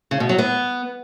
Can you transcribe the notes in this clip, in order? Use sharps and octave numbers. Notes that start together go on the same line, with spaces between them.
C#3
B2
F#3
B3